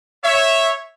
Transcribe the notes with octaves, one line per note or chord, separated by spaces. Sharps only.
C#5 E5